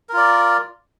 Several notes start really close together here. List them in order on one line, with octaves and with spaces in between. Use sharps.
A#4 F4 D5